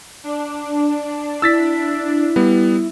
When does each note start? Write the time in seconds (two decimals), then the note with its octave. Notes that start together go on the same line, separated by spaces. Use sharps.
0.24 D4
1.42 E4 E6 A6 B6
2.36 G3 B3